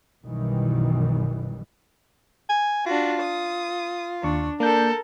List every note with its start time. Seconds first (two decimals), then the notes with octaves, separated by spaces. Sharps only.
0.23 B1 F#2 B2 D#3 E3 G3
2.50 G#5
2.86 D4 F4 F#4
3.22 D#6
4.23 D#2 D4 C#6
4.60 A#3 D4 A4 A#4 G6